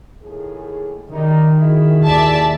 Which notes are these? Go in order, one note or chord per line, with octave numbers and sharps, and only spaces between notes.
D#2 A2 G#4
F#2 D#3 G3 D#4
E4 F#4 G#4
D#2 D5 E5 A5